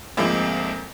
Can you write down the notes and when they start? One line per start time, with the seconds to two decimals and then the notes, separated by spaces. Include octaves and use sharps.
0.17 D2 G#2 F3 G#3 A#3 C4